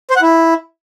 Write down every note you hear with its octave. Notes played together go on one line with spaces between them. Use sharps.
C5
F#5
E4